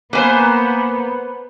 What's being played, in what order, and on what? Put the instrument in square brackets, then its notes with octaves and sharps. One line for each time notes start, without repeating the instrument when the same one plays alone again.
[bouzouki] A#3 G#5 [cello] B3 [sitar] B4 C5